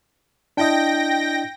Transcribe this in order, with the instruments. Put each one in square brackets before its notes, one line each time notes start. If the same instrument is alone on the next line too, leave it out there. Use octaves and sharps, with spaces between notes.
[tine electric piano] D4 E4 D#5 [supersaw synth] G5 A#6